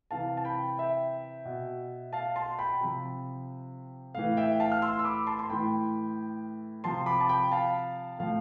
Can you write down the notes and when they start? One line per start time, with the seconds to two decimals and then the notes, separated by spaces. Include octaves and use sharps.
0.11 C3 E3 F5 A5
0.37 A5
0.45 G5 B5
0.78 E5 G5
1.45 B2
2.13 F5 A5
2.36 A5 C6
2.59 G5 B5
2.81 C3 F3
4.15 A2 E3 F5
4.37 E5 G5
4.60 F5 A5
4.72 F6
4.82 C6 E6
4.99 E6
5.04 B5 D6
5.27 A5 C6
5.39 C6
5.50 A2 E3 G5 B5
6.84 C3 F3 A5 C6
7.06 B5 D6
7.20 A5
7.29 G5 B5
7.51 F5 A5
8.18 A2 F3 F5